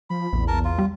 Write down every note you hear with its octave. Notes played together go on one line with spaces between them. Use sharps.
F3 B5
A#1 E2
A#4 A5
F4
G3